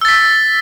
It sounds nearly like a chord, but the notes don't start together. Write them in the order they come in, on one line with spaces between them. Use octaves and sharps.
E6 A6 B6